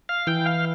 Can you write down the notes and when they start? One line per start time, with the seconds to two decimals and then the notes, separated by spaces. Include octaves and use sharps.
0.09 F5
0.27 E3 G5
0.46 F5